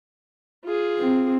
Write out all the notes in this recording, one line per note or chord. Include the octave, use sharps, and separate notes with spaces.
F4 G#4
C4